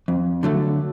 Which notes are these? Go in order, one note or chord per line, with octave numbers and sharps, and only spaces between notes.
F2
D3 F#3 A3